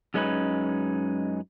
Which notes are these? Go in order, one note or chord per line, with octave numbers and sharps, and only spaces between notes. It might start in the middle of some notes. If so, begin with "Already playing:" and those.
F#2 G#3 C#4 D#4 B4